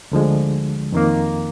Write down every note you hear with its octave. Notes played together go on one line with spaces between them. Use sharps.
D2 D3 F3 G#3
F2 D#3 A#3